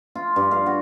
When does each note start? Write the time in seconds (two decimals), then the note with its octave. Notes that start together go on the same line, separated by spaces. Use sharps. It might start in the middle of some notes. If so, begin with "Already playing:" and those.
0.15 F4
0.36 G2
0.51 F5
0.66 F#4